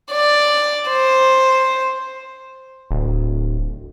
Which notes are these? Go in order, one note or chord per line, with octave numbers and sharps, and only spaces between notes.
D5
C5
D1